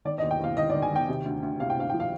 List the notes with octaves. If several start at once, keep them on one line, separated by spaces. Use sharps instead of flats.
D#3 D5
D#5
D#2
G5
D#2 F5
D#3 D#5
D5
D#3
G#5
D#3 G5
C3
D2
D2
C3 F5
G5
D2 F5
F3 G5
F5